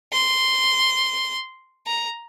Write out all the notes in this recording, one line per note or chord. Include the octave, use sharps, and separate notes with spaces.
C6
A#5